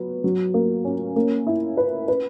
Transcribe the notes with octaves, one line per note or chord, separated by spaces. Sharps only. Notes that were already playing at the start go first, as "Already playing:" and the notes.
Already playing: F#3 B3
F#3
A#3
C#4
A#3
E4
B4
B4